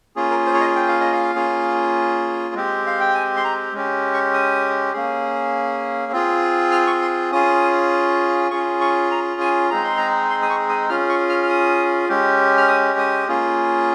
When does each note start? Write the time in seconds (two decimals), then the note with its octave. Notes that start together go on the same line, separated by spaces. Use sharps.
0.16 A#3 C#4 F4 G#4
0.31 A#4
0.46 C5
0.54 C#5
0.61 D#5
0.76 G5
0.88 F5
1.01 D#5
1.13 F5
1.35 A#3 C#4 F4 G#4
2.55 G#3 C4 G4
2.87 F5
3.00 G5
3.14 G#5
3.36 C6
3.44 A#5
3.73 G#3 C#4 G4
4.14 C#6
4.34 D#6
4.93 A#3 C#4 G#4
6.12 C4 F4 G#4
6.72 F6
6.87 C#6
7.02 C6
7.32 C#4 F4 G#4 D#6
8.51 C#4 F4 G#4 C#6
8.81 C#6
9.11 A#5
9.41 G#5
9.70 G#3 C4 D#4 G#4 A#5
9.84 C6
9.97 A#5
10.30 C6
10.42 D#6
10.50 C#6
10.69 D#6
10.89 C#4 F4 G#4 F6
11.09 C#6
11.29 F6
11.43 F6
11.49 D#6
12.09 G#3 C#4 G4
12.57 F6
12.68 D#6
12.99 D#6
13.28 A#3 C#4 F4 G#4